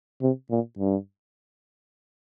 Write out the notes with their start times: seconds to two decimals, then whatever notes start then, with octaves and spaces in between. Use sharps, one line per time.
0.22 C3
0.51 A#2
0.79 G2